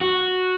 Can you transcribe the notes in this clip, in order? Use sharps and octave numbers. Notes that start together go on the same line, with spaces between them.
F#4